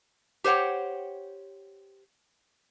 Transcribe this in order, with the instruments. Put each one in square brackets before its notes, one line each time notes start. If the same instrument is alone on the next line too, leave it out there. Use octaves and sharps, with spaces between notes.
[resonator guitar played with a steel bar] G4 C5 C#5 F#5 G5